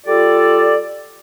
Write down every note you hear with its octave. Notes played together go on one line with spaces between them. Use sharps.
G3 F4 A4 D5